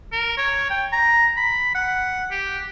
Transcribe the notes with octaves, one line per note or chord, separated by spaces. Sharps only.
A#4
C#5
G5
A#5
B5
F#5
G4